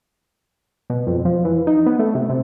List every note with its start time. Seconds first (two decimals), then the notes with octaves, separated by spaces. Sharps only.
0.90 B2
1.07 F2
1.25 F3
1.45 E3
1.67 D#4
1.86 B3
1.99 A3
2.15 C3
2.30 C3